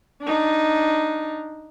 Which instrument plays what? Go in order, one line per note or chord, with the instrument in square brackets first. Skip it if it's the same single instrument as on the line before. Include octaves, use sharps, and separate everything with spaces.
[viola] D4 D#4